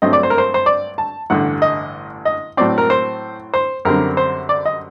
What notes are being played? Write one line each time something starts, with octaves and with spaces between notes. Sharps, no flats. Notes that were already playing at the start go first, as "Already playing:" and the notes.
G2 F#3 A3 C4 D#5
D5
C5
A#4
C5
C5
D5
A5
A1 G2 D3 F#5
D#5
D#5
A2 F#3 C4 D5
A#4
C5
C5
F#2 D3 G3 C4 A#4
C5
D5
D#5